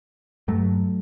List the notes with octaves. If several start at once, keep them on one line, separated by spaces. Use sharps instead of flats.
G2 F#3 A3